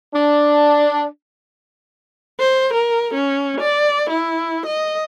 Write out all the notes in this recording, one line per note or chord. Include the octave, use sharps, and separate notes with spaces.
D4
C5
A#4
C#4
D5
E4
D#5